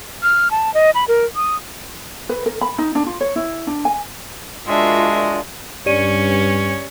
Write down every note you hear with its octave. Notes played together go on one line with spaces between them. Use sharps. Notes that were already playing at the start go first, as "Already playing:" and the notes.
F6
A5
D#5
B5
A#4
D#6
B4
A#4
B5
D#4
D4
F4
C#5
E4
D4
G#5
G#3 D4 F4 F#4 A#4 E5
G2 C#4 G4 C#5 D5 D#7